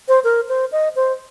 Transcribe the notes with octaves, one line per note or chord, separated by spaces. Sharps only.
C5
A#4
C5
D#5
C5